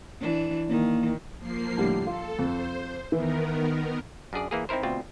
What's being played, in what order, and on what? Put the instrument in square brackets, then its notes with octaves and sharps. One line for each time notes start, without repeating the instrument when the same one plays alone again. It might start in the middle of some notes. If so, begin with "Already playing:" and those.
[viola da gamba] E3 D4
[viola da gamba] D#3 [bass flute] A#3
[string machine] F3 A#3 C7
[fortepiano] A2 D3 G3
[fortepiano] F4 [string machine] A4
[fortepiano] F2 [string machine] C5
[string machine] D#3 B3 A#4 [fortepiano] E3
[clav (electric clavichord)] F#2 D4 G#4 D5
E3 A#3 G#4
C4 D#4 E4 A#4 C5
D2 B2 C4 F4